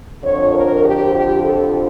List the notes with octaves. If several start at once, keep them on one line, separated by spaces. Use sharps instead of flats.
F2 D3 F3 C#5
A#4
G4
G4
A4